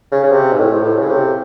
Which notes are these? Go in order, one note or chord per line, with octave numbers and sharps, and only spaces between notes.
C#3
C#3
C3
G#2
A2
A2
C#3
C3